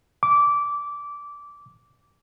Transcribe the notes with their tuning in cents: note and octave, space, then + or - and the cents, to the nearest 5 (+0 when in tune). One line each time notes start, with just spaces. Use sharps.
D6 -15